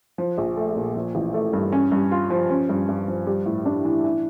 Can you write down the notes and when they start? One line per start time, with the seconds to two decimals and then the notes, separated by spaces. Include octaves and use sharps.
0.18 F3
0.38 A#1
0.57 A3
0.76 A#2
0.96 F3
1.15 A1
1.34 A3
1.53 G2
1.72 C#4
1.92 G2
2.12 F4
2.30 F3
2.50 C#4
2.69 G2
2.89 G2
3.08 F3
3.27 G3
3.46 A2
3.66 D4
3.85 E3
4.04 E3